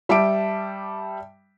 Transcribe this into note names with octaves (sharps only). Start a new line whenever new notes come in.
G3 E5 G5 A5 D6 D7